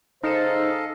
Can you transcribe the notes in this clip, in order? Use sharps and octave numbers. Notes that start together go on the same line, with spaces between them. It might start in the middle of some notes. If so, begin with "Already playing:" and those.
C#3 D#4 G#4 A4 C5 D#5 F5